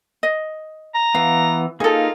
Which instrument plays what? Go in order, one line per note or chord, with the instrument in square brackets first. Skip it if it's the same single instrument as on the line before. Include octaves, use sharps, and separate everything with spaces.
[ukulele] D#5
[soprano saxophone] A#5
[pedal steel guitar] E3 B3 [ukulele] F5
[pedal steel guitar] A#3 D#4 [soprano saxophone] F4 [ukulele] G#4 A4